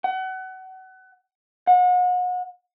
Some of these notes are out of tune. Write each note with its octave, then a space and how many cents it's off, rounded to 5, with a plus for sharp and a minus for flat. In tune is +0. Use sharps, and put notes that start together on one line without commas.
F#5 +30
F#5 -35